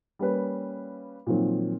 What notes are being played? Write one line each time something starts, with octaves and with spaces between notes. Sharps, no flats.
G3 A#3 C#4 B4
A#2 D#3 F3 F#3 C4